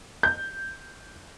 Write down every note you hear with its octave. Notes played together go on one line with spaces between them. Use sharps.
G6